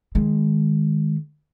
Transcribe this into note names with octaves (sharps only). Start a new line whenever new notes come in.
D#3 G#3